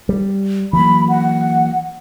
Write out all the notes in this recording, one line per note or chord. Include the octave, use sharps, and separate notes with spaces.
G3
E3 F#3 A#3 B5
F#5